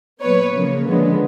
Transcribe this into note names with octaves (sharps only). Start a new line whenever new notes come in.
A#2 F#3 B3 B4 C#5
C#3 F3 A#3
D3 F3 G#3 B3